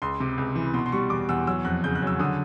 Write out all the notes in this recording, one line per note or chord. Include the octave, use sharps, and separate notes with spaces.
C#2 C6
C3
C#2
E3
B2 C6
C6
G3 C#6
E2 D6
E2 E6
F#3 E6
F2 F#6
C#3 G6
F#6
F#3 E6
D3 D#6